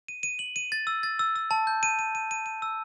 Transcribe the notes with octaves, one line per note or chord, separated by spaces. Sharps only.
D#7
D#7
F#7
D#7
A6
E6
A6
E6
E6
A5
G6
D#7
D#7
D#7
D#7
D#7
E6